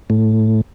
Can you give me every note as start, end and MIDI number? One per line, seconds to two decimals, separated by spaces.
0.10 0.61 45